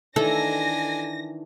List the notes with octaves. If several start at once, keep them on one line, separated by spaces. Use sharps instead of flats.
D#3 E3 D4 A4 G#5 A#5 A#6